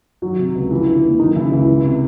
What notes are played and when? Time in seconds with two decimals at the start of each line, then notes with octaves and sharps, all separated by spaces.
0.22 D#3 F#3 F#4
0.39 C3
0.55 C#2
0.71 E3 F3 E4
0.87 D3
1.04 D#2
1.19 D#3 F#3 D#4
1.36 C#3 E3 E4
1.52 C#2 E3 E4
1.68 E3
1.84 C3